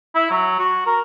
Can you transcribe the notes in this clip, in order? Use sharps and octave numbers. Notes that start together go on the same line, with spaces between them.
E4
F#3
F#4
A#4